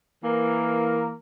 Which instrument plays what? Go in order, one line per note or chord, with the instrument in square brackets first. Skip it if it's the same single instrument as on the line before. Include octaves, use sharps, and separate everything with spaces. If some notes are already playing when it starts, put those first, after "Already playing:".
[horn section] E3 A#3 A#4